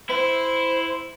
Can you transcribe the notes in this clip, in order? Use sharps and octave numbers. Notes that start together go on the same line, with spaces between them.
E4 C5